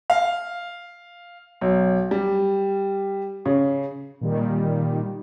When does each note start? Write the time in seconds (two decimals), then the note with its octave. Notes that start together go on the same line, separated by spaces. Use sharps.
0.10 F5
1.61 B1
2.11 G3
3.46 C#3
4.21 A#2 D#3 G3